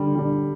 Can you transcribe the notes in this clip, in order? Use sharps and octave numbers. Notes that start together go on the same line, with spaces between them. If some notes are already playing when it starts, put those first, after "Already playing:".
Already playing: D3 G3 D4
G3 D4